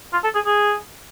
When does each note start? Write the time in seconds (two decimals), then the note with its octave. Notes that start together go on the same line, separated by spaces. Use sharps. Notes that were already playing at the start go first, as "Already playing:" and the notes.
0.13 F4
0.24 A4
0.35 G#4
0.46 G#4